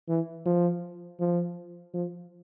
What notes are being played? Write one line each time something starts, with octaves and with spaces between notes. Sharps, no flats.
E3
F3
F3
F3